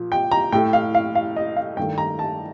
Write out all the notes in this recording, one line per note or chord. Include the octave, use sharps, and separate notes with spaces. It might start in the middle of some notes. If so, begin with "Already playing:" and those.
Already playing: A#2 F3
G5
A#5
A2 A3 G5
F5
F5
F5
D#5
F5
G2 D#3 A3 G5
A#5
A5